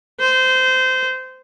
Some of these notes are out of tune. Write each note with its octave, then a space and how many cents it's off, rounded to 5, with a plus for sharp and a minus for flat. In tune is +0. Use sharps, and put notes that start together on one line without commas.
C5 -20